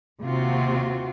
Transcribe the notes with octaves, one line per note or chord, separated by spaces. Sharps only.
D#2 C3 C4 F4 F#4